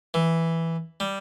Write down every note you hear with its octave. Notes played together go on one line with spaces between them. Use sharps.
E3
G3